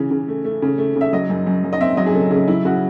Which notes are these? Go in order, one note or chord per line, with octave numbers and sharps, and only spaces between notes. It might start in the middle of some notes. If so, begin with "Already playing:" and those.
Already playing: C#3 E3
C#3
A3
A3
C#3
A3
C#3
E5
F#3 D#5
F#2
F#2
F#2
D#5
C4 E5
F#3 D#5
G#4
C#3 A4
C#3 G#4
F#3 E4
C#3 F#4